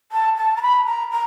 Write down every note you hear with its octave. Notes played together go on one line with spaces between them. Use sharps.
A5
A5
A#5
B5
A#5
A#5